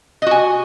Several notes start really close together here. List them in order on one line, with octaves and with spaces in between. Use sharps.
D#5 F#4 G#5